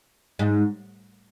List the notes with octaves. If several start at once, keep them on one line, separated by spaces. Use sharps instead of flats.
G#2